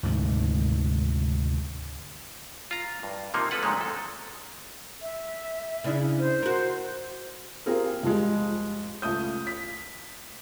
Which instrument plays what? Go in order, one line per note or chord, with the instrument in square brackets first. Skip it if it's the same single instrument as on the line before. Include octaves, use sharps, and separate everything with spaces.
[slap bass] D2 G#2 C3 D#3
[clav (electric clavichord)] F4 A#5
G2
C3 F3 A#3 D#4 F4
G#3 C4 A4 B4 F#5
A#2 D3 D#3 F3 F#3 G#3
C4 A4
[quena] E5
[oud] C#3 D4 E4
[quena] C5
[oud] F#4 A#4
[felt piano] C4 F4 G4 G#4 A#4
F2 F3 G3 G#3
C#2 A3 D#6 G6
B6